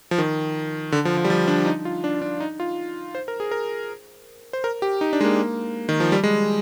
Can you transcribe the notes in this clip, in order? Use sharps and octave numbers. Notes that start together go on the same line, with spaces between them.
F3
D#3
D3
F3
F3
G3
F3
D4
D#4
F4
D4
D4
D#4
F4
C5
A#4
G#4
A#4
C5
A#4
G4
D#4
D4
G#3
A#3
D#3
F3
G3
G#3